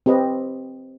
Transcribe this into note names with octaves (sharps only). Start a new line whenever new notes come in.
C4 G4 B4 D#5